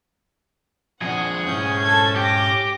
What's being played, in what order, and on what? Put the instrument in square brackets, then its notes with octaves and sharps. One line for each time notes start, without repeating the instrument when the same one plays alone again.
[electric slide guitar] F3 C4 D4 [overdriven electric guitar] G#4 [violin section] F#5
[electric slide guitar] G#2 E4 [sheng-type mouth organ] C#4 G6
[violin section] A4 A5 G#6
[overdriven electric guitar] G4 [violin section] D6 A#6